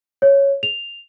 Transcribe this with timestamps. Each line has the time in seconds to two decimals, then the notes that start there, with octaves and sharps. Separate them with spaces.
0.22 C#5
0.63 F7